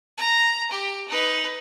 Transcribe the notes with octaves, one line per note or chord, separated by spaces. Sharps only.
A#5
G4
D#4 B4